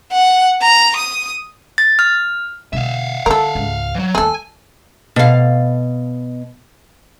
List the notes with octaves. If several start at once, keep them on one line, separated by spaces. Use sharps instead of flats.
F#5
A#5
D#6
A6
F6
B2 D3 E5 F5
D3 A4 A#4
C#2 G#2
E3 F#3
D#2 A3 G#4 A4 G#5
B2 F5